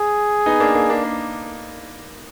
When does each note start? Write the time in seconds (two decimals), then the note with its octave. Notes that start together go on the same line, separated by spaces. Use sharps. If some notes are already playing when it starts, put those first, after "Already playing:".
Already playing: G#4
0.46 B3 D#4
0.60 A#3 D4
0.75 A#3 D4
0.89 A#3 D4
1.04 A#3 D4